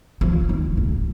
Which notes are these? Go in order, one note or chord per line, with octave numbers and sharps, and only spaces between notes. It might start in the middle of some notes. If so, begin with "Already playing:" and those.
F3
D#3
C#3